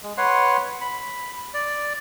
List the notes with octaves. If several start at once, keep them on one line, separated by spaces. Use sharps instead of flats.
G#3
B4 C#5 F#5 C6
B5
D5